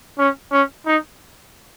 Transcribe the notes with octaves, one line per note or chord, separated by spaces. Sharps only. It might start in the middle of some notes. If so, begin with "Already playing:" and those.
C#4
C#4
D#4